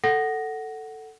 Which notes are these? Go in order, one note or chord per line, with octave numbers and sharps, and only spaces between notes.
A4 F#5 A#6